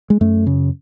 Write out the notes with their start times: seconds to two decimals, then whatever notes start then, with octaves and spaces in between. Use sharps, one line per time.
0.10 G#3
0.21 F#2 A3
0.46 C#3